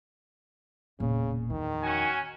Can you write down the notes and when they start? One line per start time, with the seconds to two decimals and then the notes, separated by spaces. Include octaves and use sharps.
1.00 E1 A#2 C#3
1.50 E2 D#3 F3
1.82 C#4 F#4 G#5